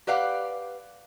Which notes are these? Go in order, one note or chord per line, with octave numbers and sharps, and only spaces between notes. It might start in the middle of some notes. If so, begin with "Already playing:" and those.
G4 B4 D5 F5 F#5